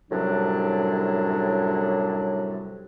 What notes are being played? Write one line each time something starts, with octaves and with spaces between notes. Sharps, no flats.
F#2 A2 C3 F#3 G3 D4